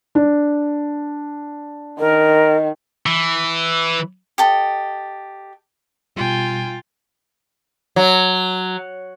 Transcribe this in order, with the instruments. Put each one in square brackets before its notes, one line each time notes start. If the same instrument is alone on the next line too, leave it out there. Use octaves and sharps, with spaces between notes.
[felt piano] D4
[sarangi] D#3 [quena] A#4
[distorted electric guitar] E3
[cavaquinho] G4 A4 D#5
[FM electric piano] B2 G3 [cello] F4 [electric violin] G5 G#5
[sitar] F#3